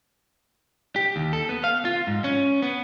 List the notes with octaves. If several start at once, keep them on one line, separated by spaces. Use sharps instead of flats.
G4
D#2
A4
B3
F5
F4
G#2
C#4
B3